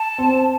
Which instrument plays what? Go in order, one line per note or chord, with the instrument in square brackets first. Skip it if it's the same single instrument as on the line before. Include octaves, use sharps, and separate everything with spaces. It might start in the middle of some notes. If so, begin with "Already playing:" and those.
Already playing: [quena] A5
[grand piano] C4